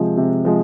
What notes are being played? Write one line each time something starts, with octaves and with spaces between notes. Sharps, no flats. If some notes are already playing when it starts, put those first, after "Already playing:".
Already playing: C3 F3 G#3
C3
F3 G#3